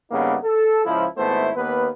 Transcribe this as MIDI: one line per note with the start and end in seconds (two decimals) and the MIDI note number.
0.11 0.36 43
0.11 0.36 49
0.11 0.36 58
0.11 0.36 59
0.11 0.36 63
0.11 0.36 64
0.43 0.85 69
0.85 1.05 37
0.85 1.05 53
0.85 1.05 64
1.17 1.50 32
1.17 1.50 57
1.17 1.50 59
1.17 1.50 64
1.17 1.50 69
1.17 1.50 72
1.56 1.88 39
1.56 1.88 58
1.56 1.88 59
1.56 1.88 71